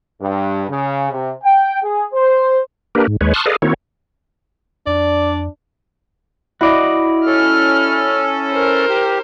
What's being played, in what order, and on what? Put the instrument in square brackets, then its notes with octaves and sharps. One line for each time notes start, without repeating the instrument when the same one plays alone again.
[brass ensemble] G2
C#3
C3
G5
G#4
C5
[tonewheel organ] A#3 D4 G4 A#4 B4
G#2
D#2 G#3 B4 C#5
A5 C6 C#6 D#6 F6 F#6
G#4 A4 B4 D5 D#5 F5
D#3 A#3 C4 E4 F#4 C#5
[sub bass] F2 [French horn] D4 [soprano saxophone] D5
[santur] E4 [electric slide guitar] F#4 D5 D#5
[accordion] C#4 A4 [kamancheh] F6
[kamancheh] A#4 C5
[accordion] G4